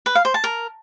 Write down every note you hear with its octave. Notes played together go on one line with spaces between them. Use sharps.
B4
F5
C5
A5
A#4